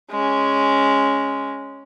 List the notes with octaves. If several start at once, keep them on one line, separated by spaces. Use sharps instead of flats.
G#3 C#4